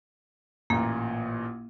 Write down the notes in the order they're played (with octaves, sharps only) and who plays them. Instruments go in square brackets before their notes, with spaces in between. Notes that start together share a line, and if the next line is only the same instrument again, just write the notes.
[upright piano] A1 A#2 [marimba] A#3